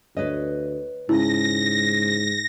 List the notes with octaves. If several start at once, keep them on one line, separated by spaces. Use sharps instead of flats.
D2 B4 C#5 D#5
G#2 C#3 E4 A#6